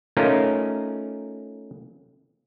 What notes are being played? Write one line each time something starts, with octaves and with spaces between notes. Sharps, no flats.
A3 C#4 D#4 F4 A#4